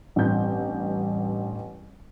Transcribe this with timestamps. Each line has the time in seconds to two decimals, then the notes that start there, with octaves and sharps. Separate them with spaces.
0.16 A1 G2 C4 G6